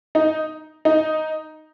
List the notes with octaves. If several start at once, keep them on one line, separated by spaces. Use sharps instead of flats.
D#4
D#4